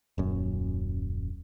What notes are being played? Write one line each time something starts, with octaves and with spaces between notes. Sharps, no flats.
D#1 F#2